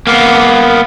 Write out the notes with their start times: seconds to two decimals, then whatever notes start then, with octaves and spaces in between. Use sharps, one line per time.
0.07 A#3 B3